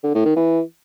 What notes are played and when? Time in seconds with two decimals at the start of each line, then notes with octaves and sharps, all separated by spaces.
0.03 D3
0.14 A2
0.25 D#3
0.36 E3